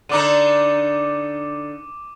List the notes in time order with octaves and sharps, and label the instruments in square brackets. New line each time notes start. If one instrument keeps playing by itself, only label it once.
[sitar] D3 D4 D#4 [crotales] D6 D#7